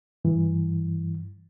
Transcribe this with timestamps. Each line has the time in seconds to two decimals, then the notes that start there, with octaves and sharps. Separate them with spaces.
0.25 G2 E3